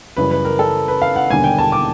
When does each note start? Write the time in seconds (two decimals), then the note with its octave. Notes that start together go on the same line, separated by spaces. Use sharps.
0.17 F#2 C#3 E3 G3 B4
0.31 B4
0.45 A#4
0.59 A4
0.88 B4
1.02 F5
1.16 F#5
1.30 E1 D#2 D3 G3 A#3 G#5
1.44 G5
1.58 A5
1.72 D6